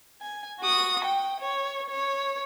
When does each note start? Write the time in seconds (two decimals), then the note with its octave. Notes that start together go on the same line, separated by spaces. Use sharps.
0.22 G#5
0.60 F#4 D#6
1.05 G5
1.41 C#5
1.90 C#5